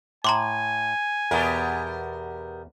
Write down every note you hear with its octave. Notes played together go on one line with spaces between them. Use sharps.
A2 G#5 A#5 C6 D6
E2 B2 B3 G4 A#4